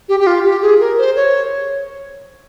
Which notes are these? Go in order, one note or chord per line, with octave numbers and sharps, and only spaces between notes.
G4
G4
F4
G4
G#4
A#4
C5
C#5